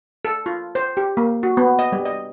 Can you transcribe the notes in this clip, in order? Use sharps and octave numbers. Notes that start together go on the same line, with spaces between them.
A4
F4
C5
G4
A#3
F#4
B3
D#5
G3
D#5